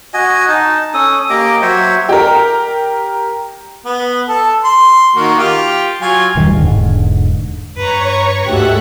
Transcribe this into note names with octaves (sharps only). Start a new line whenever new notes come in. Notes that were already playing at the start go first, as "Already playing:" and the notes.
F#4 D#5 G#5
D#4 A5
C#4 A4 D#6
A#3 G4 D#5 D6
F#3 C5 C#5 E5
G4 A#4
B3
A4 A5
C6
D#3 A#3 F#4
F4 G4
F#3 F4 G#5
D#1 G2 D#3 G3
E1 G#2 D3
G2 B4 C#5 A#5 C#6
D2 G#2 G#3 G4 A4 E5 F#5 F#6